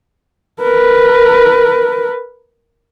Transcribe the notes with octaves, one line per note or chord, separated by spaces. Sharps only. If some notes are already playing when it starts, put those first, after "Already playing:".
A#4 B4